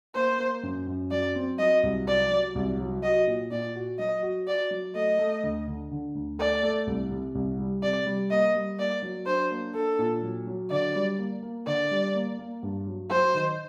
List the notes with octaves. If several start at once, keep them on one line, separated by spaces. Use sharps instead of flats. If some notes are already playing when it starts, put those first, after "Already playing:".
A#3 C5
A#3
F#2
F#2
F#3 D5
C4
F#3 D#5
C2
F#3 D5
F#3
C2
F#3
F#4 D#5
A#2
A#2 D5
F#4
F#3 D#5
F#4
F#4 D5
F#3
A3 D#5
A3
D2
D3
D3
D2
A3 D5
A3
C2
C3
C2
G3
C3 D5
G3
A#3 D#5
G3
A#3 D5
F#3
D4 C5
A#3
D4 A4
A#2
F#3
F#3
D3 D5
G3
A#3
A#3
D3 D5
G3
A#3
A#3
G2
F#3
F#3 C5
D#3